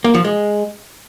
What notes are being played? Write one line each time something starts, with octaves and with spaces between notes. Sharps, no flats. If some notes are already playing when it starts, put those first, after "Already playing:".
A#3
F3
G#3